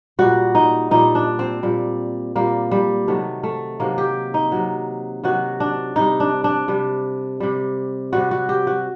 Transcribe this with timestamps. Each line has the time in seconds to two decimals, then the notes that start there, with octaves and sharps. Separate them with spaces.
0.19 A#2 G3 F#4
0.55 D#4
0.91 A#2 G3 D#4
1.15 D4
1.39 C4
1.63 A#2 G3
2.35 A#2 G3 A#3
2.71 G3
3.07 C3 D#3 F#3 A3
3.43 A3
3.80 C3 D#3 F#3 A#3
3.98 G4
4.34 D#4
4.52 C3 D#3 F#3
5.24 C3 D#3 F#3 F#4
5.60 D4
5.96 C3 G3 D#4
6.20 D4
6.44 D4
6.68 C3 G3
7.40 C3 G3
8.13 C3 G3 F#4
8.31 F#4
8.49 G4
8.67 F#4